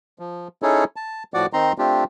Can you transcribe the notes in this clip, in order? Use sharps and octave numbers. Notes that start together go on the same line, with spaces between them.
F3
C#4 D#4 E4 G#4 A4 C#5
A5
A2 F3 F#4 D5 F#5 D6
D#3 C4 D#4 A#5 C6
A3 C4 D4 F4 G4